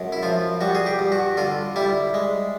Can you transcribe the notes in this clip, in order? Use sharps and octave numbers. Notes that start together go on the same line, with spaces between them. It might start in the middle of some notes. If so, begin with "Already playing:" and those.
Already playing: F#2 G#3
E4
F3 F4
G3 F#4
G#4
G4
G2
F#4
D3 F4
G3 E4
G#3